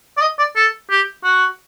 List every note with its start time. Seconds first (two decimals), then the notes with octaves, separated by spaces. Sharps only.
0.17 D5
0.21 D#5
0.39 D5
0.56 A4
0.90 G4
1.24 F#4